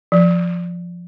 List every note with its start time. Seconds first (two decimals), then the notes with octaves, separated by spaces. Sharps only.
0.12 F3